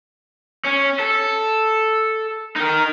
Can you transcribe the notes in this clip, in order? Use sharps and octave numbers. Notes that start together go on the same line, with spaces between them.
C#4
A4
D#4 A#4